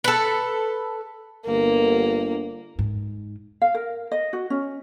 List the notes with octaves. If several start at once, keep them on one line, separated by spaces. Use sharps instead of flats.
A4 B4
G1 A#3
G#2
F5
A#4
D#5
F#4
C#4